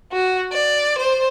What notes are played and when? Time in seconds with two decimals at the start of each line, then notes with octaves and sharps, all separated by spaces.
0.11 F#4
0.51 D5
0.98 C5